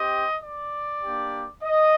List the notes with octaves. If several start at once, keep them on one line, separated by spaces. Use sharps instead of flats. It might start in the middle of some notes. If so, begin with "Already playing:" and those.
Already playing: C4 G4 D#5
D5
A#3 D4 G4
D#5